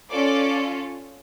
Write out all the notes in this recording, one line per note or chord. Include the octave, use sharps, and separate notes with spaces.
C#4 F4 A4 D5 D6